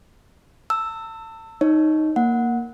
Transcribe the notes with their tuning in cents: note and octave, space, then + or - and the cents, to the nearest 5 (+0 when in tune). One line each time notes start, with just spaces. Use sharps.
A5 +35 E6 +0
D#4 +0 C#5 +0
A#3 +0 F#5 -10